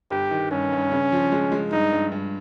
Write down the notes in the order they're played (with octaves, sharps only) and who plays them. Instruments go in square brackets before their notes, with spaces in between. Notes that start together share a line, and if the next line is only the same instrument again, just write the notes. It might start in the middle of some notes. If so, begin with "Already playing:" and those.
[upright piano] G1 [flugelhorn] G4
[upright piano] D#3
[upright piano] G2 [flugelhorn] C#4
[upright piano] G2
C#3
F3
G#3
G#3
[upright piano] G2 [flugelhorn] D#4
[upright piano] G2
G2